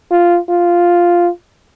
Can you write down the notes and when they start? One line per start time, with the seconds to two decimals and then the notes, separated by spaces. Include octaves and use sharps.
0.11 F4
0.50 F4